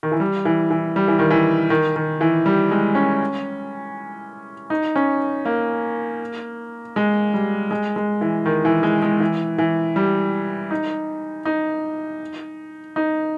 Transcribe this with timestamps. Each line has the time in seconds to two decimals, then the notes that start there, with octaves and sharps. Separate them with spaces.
0.03 D#3
0.12 E3
0.20 G3
0.45 E3
0.70 E3
0.96 G3
1.08 E3
1.19 D#3
1.30 E3
1.70 D#3
1.96 D#3
2.21 E3
2.46 G3
2.71 G#3
2.95 C#4
4.70 D#4
4.96 C#4
5.45 A#3
6.96 G#3
7.34 G3
7.71 G#3
7.96 G#3
8.21 E3
8.46 D#3
8.65 E3
8.83 G#3
9.02 G#3
9.20 E3
9.58 E3
9.96 G3
10.71 D#4
11.45 D#4
12.96 D#4